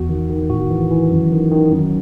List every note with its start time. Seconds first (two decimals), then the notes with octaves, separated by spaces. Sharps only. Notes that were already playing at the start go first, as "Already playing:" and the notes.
Already playing: E2 F#4
0.09 D#3
0.30 D#3
0.50 A2 F#4
0.70 E3
0.90 E3
1.12 F#2
1.32 D#3
1.51 D#3
1.72 F#2